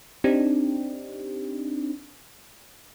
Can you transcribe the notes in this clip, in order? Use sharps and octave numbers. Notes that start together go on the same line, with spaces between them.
C4 D4 D#4 G4